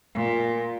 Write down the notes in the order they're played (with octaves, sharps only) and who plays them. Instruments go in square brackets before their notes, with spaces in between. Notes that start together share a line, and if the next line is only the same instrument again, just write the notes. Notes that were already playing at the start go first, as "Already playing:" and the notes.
[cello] A#2